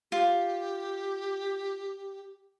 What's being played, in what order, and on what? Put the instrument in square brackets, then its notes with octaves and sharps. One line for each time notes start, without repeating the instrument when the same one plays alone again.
[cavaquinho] F4 [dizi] G4